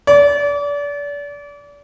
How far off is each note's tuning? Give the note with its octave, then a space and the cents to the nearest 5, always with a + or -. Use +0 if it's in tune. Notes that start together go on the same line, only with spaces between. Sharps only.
D5 -35